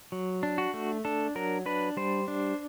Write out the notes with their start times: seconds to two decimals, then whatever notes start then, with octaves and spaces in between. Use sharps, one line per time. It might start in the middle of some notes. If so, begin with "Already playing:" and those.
0.12 F#3
0.43 D4
0.58 F#4
0.74 A3
1.05 D4 A4
1.35 F#3 A#4
1.66 D4 B4
1.97 G3 C5
2.28 D4